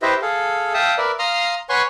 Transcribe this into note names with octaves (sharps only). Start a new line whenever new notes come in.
E4 G4 B4 C5 D#5 E5
G#4 A4 F5
E5 F5 G5 A5 D#6
A#4 B4 D5 E5
F5 A#5 C6 D#6 F6
B4 C#5 F#5 G#5 C6 C#6